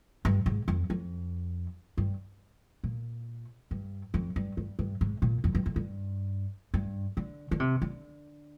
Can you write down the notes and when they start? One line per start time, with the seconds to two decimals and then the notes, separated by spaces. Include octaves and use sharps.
0.25 G2
0.46 G#2
0.68 F2
0.90 F2
1.98 G2
2.84 A#2
3.71 G2
4.14 F2
4.36 G2
4.57 G2
4.79 G2
5.01 G#2
5.22 A#2
5.44 F2
5.55 G2
5.66 F2
5.76 G2
6.74 G2
7.17 D3
7.51 D3
7.60 C3
7.82 D3